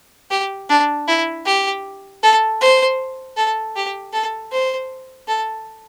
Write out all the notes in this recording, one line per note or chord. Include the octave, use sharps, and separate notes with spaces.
G4
D4
E4
G4
A4
C5
A4
G4
A4
C5
A4